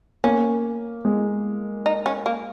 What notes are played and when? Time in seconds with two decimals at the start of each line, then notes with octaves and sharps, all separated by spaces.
0.24 A#3 C#4
1.05 G#3
1.86 D#4
2.06 C#4
2.26 A#3